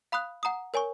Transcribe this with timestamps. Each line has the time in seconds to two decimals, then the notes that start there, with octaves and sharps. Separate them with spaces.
0.12 F5 B5 D#6 F#6
0.43 F#5 A#5 D#6
0.74 A#4 C#5 G#5 C#6